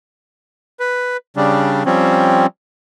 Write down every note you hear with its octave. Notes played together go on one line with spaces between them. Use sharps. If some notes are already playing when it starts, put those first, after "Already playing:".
B4
C#3 G3 D4
F3 G3 C4 C#4